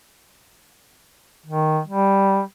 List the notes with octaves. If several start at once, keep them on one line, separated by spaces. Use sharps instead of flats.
D#3
G3